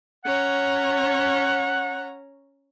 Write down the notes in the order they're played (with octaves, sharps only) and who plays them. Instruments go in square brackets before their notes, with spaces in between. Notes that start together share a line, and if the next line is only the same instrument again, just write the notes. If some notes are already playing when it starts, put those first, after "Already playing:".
[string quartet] C#4 C#5 A#5 [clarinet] F#5